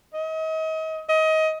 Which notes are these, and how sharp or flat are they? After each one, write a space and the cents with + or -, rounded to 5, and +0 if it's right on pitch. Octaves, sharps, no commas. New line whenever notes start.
D#5 +35
D#5 +25